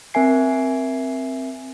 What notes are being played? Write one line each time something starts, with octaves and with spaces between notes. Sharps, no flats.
C4 A#4 E5 G#5 C7